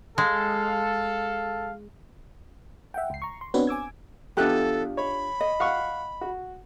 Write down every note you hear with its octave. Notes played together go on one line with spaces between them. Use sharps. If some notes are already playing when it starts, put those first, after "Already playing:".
G#3 A4 F5
E5 F#5 G5
C#2 C7
A#5 C#6
C6
B3 C4 D4 F#4 B4 C#5
G#5 D6 E6 G#6
E2 D4 F4 G4 A4 F#5 F#6
C#5 B5
D#5
F5 F#5 C#6
F#4